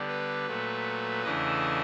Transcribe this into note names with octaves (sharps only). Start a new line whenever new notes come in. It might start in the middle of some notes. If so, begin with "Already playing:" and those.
Already playing: D3 G3 B3 D4
B4
A#2 F#3 A3
E2 C#3 E3 A3 D4 D#5